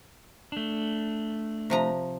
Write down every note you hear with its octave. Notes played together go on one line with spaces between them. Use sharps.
A3 D4
C3 F3 A#5